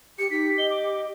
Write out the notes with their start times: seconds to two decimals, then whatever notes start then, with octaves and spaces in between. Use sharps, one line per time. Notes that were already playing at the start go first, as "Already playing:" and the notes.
0.19 G4 C#7
0.31 D#4 G4 B6
0.58 D#5 G7
0.70 D6